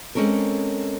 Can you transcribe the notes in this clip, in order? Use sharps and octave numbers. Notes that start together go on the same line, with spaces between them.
G#3 C4 C#4 A4 A#4